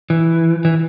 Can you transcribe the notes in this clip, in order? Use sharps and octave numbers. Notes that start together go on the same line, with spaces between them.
E3
E3